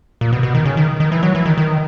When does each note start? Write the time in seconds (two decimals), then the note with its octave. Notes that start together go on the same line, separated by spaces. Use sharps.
0.21 A#2
0.33 B2
0.43 B2
0.55 D#3
0.66 C#3
0.77 D#3
1.00 D#3
1.12 E3
1.23 F#3
1.35 E3
1.46 D#3
1.58 D#3